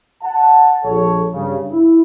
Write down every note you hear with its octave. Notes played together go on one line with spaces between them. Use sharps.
F#5 A5
A#1 A4 C#5
G2 C#3
E4